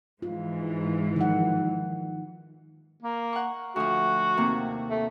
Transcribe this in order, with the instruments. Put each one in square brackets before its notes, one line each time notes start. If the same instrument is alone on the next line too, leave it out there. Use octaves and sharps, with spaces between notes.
[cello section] G#2 E3 [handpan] F4
[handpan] D#3 F3 F#5
[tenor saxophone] A#3
[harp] F#5 C#6
[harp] D2 F3 [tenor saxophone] F#4
[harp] D#2 C3 A#3
[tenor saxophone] A3